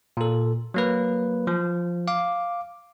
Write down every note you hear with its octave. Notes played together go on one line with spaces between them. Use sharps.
A#2 A4
F#3 A#3 B4
F3
F5 D6